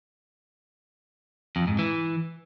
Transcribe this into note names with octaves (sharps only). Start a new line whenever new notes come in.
F2
G#2
E3